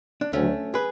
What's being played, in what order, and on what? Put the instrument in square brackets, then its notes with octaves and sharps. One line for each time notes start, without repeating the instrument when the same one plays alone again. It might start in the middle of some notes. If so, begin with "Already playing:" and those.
[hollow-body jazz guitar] D4
[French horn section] D2 C#3 F#3 [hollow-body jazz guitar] A3 C#4
[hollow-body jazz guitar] G#4 B4